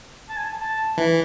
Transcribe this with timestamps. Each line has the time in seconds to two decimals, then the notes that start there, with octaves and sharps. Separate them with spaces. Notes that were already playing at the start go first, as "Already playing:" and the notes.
0.29 A5
0.36 G#5
0.44 A5
0.60 A5
0.98 E3